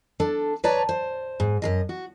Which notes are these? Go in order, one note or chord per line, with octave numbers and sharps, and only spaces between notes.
D4 A4
B4 C#5 D5 A5 A#5
C5
G#2
F#2 C#3 D#5
F#4